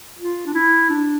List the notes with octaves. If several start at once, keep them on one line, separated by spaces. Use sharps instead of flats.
F4
D4
E4
D4